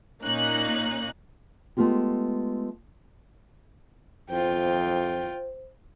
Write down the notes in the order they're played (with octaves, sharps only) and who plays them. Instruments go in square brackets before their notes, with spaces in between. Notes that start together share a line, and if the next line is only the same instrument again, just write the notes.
[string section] A#2 A#3 C#4 D#4 F#6
[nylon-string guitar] G#3 A3 B3 D4 F4 G4
[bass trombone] F2 [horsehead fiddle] F4 G5 [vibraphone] C5